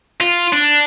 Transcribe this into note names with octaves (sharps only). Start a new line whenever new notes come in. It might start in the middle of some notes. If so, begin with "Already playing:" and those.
F4
D4